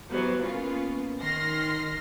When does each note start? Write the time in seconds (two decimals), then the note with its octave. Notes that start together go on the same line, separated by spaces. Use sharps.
0.11 E3 F#3 G3 B3 C5
0.43 A#3 B3 C#4 F4
1.22 D#3 C6 F6 A#6